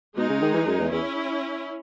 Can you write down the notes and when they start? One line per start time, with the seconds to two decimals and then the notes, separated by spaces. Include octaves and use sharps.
0.17 B2 G#3 D#4 G#4
0.30 C#3
0.42 D#3
0.54 E3
0.67 F#2
0.80 E2
0.92 E2 C#4 E4